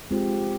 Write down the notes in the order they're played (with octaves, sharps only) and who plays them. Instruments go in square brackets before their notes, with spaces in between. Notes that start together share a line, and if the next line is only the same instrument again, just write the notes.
[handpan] G#3 C4 F4 C5 [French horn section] G4